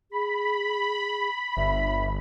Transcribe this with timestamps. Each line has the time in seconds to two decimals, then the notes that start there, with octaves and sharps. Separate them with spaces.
0.12 G#4 B5
1.57 G1 E5